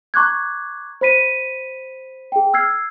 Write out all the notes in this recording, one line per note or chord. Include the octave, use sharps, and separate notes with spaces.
A#5 C#6 D6 F#6 G#6
C5 B5 B6 D#7
G#4 G5
E6 F6 G#6 C7